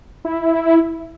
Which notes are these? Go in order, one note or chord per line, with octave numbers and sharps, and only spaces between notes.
E4